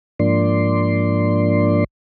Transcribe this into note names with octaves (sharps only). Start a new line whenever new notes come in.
G#2 F3 A#3 D4 D5 C6